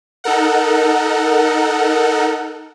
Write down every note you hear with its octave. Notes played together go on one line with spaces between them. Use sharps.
D#4 A4 A#4 F#5